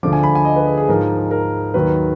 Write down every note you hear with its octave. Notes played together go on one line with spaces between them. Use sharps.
D2 D3 F3 D6
G#5
B5
G#5
D#5
B4
G#4
G#4
G#2 F3 A#4
A#4
D#2 D#3 F#3 B4